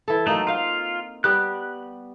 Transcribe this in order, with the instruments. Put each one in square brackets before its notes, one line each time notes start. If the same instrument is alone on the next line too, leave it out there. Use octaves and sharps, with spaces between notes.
[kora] E3 A4
[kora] F#3 A#3 D#4 [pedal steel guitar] A3
[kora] C4 F5 [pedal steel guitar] F4
[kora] G3 B3 G4 [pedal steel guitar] F#6